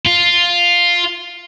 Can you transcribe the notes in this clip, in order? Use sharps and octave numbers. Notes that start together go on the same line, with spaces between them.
F4